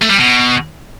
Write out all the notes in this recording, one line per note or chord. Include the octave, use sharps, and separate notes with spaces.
A3
G3
B2